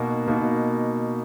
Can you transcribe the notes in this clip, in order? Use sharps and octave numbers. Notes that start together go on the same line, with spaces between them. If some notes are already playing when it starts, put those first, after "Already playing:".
Already playing: B2 A#3 D#4 F#4
B2 A#3 D#4 F#4